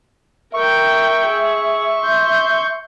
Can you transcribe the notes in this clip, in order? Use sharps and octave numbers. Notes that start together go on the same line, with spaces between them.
A#4 E5 G5 C#6
G#4
C6 G6